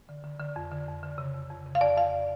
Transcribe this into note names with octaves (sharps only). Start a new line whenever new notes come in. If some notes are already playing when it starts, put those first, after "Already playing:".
D3
D3
D3
F2
D3
F2
D3
C#3
F2
F2
C#3
F5
F2 D5
F2 F5